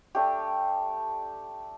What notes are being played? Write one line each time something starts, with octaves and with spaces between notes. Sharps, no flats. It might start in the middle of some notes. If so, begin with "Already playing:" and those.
A3 D4 G4